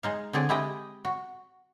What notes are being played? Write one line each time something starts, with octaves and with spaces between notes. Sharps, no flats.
G#3 D#4 F5
D3 C4 G#4 D5
G#3 E4 G4 D#5 G5
F#4